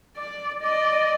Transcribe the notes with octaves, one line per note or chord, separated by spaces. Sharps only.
D5
D5 D#5